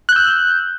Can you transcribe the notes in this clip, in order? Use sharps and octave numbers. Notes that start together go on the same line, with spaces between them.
E6 F#6 G6